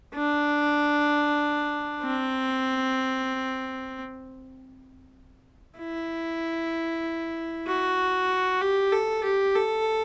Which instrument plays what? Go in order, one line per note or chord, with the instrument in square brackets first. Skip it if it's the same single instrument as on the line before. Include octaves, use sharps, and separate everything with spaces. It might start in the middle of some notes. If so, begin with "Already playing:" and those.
[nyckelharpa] D4
C4
E4
F#4
G4
A4
G4
A4